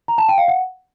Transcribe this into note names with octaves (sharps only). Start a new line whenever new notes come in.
A#5
A5
G5
F5
F#5